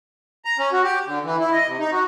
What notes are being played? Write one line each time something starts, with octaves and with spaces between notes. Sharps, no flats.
A#5
C#4
F#4
G4
D3
E3
E4
D#5
C3
D#4
F#4